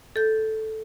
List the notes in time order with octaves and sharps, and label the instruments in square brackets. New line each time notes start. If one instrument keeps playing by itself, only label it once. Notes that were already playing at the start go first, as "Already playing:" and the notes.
[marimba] A4 G6